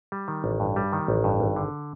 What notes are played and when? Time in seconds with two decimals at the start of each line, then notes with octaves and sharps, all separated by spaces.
0.12 G3
0.28 D#3
0.44 A1
0.60 G2
0.76 G3
0.93 D#3
1.08 A1
1.24 G2
1.40 G#1
1.56 D3